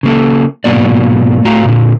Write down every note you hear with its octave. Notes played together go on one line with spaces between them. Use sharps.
C#3 A#3 A4
G#2 B2 F#3 A#3 D5
A2 A3 F#4 F5 A#5
A#2 D3